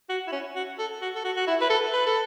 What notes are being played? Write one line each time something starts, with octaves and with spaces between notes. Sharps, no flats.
F#4
E4
C#4
F#4
A4
F#4
A4
F#4
F#4
E4
B4
A4
B4
A4